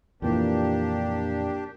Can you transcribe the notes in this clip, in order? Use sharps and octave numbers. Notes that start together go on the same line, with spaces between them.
F2 A#2 E3 A#3 D4 G4